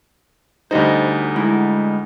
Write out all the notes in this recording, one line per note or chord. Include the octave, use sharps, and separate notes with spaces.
D2 G3 D#4 C5 D#5
G#3 E4